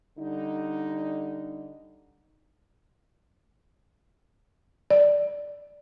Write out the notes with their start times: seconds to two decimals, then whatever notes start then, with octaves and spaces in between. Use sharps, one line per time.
0.17 D3 G3 D#4
4.91 D5